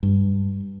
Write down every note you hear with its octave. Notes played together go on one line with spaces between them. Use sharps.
G2